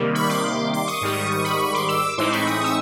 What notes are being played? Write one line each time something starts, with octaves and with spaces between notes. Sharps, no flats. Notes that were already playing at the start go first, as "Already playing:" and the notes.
Already playing: C3 D#3 G3 A#3
B5 C#6
C6 D6
C6 D6
C#6 D#6
G#2 D#3 G3 C#6 D#6
C#6 D#6
B5 C#6
B5 C#6
C6 D6
D6 E6
A2 E3 G#3 C4 D#4 C6 D6
B5 C#6
C#6 D#6
E6